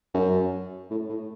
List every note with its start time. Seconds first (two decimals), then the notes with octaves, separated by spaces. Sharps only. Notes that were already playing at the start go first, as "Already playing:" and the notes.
0.14 F#2
0.90 A2
1.09 A2